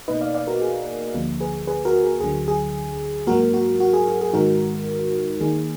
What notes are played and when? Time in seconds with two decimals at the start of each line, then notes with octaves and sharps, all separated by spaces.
0.08 B2 A#3 D#4 B4 D#5
0.21 D5 F5
0.34 D5 F5
0.47 F#4 A#4
0.61 G#4
1.14 D2 D3 F3 A#3
1.40 G#4 B4
1.67 G#4 B4
1.85 F#4 A#4
2.03 G#4
2.20 D2 D3 F#3 G#4
2.48 G#4
3.27 G#2 F#3 A#3 F#4 A#4
3.54 F#4
3.80 F#4
3.93 G#4
4.07 G#4
4.21 G#4
4.33 G#2 D#3 G#3 D#4 F#4 A#4
5.40 D#2 D#3 A#3 D#4 G#4